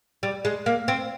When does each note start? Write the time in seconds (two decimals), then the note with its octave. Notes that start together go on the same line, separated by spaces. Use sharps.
0.23 G3
0.45 G#3
0.66 A#3
0.88 C4